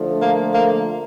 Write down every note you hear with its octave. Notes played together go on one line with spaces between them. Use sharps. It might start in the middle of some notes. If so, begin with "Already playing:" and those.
Already playing: D3 F3 A3
A#3
A#3